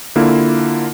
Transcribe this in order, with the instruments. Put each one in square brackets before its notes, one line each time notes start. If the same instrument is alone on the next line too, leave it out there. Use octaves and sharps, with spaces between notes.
[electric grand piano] D3 A#3 E4 F4